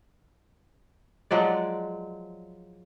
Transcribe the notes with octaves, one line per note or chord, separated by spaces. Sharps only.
F3 F#3 G#3 D5